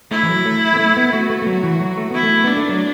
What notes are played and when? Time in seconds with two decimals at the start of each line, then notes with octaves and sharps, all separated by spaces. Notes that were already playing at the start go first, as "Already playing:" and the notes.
0.11 A3 E4
0.23 E3
0.29 F#3
0.45 A3
0.76 B3
0.79 A3
0.97 B3
1.13 A3 F#4
1.30 A3
1.42 A3
1.46 F#3
1.63 E3
1.81 F#3
1.97 A3
2.11 B3 E4
2.23 A3
2.44 B3 D4
2.57 A3
2.69 F#3